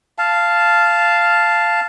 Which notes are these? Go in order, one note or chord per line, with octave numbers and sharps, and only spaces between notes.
F5 A5